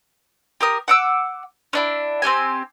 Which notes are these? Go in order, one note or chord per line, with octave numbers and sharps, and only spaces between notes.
G4 A#4 D#6
F#5 D6 E6
C#4 D4 E4
C4 C#4 G4 G#5